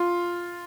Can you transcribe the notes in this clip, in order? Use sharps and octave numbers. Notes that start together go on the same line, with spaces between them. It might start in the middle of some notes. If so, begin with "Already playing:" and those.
Already playing: F4